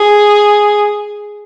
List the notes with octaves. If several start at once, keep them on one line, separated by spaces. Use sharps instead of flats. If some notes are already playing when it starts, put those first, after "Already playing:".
Already playing: G#4